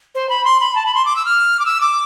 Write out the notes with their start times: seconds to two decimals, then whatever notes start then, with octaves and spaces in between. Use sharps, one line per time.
0.15 C5
0.29 B5
0.45 C6
0.60 B5
0.75 A5
0.86 B5
0.95 C6
1.05 D6
1.16 E6
1.25 F6
1.59 D6
1.65 E6
1.81 D6